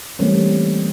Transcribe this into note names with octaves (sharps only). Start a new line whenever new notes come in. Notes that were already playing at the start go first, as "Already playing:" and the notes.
E3 G3 A3 A#3 C4 C#4